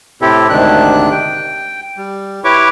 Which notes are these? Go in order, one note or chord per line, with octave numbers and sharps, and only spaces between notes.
A2 C3 C4 E4 G4 A4
D2 G#2 C3 D#3 D4 F#6
G5
G3
E4 G4 B4 C#5 C#6 D6